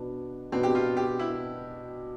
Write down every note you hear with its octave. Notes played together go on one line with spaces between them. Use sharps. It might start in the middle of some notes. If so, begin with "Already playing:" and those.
Already playing: B2 B3 D4
B2 B3 C4 D4
G4
F4
G4
E4